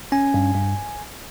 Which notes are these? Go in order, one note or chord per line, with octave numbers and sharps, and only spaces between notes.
C#4 G#5
G2
G2